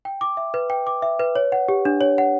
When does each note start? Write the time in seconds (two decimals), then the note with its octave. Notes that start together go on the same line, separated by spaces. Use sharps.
0.05 G5
0.21 D6
0.37 E5
0.54 B4
0.70 G5
0.87 D6
1.02 E5
1.20 B4
1.36 C#5
1.52 F#5
1.69 G4
1.85 D4
2.01 C#5
2.18 F#5